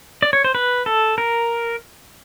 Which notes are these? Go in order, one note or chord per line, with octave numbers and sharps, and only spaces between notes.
D5
C#5
C5
B4
A4
A#4